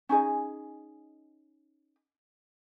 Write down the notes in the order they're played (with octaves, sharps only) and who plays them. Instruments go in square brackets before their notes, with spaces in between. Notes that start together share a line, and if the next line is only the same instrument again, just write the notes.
[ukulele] C#4 D#4 G#4 D#5